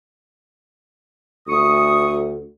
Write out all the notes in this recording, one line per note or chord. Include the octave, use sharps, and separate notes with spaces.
D2 C#6 D#6